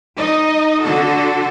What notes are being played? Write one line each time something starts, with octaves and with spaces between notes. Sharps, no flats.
D#4 D#5
D3 F#4 A4